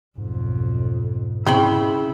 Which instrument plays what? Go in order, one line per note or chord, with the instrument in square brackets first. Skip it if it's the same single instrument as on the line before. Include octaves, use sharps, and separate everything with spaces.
[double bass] B1 F2 [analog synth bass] G#2
[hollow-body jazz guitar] C#3 G5 B5 [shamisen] C4 [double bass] E4